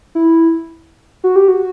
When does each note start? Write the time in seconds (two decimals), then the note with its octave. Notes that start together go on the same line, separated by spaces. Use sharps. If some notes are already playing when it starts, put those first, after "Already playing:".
0.15 E4
1.24 F#4
1.36 G4
1.48 F#4